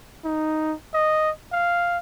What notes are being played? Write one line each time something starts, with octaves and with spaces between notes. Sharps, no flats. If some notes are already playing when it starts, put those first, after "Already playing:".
D#4
D#5
F5